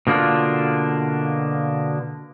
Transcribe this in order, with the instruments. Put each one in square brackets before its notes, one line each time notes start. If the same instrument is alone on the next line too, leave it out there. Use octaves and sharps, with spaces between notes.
[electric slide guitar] B2 D3 A#3 D4 F4